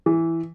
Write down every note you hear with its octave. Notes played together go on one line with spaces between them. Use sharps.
E3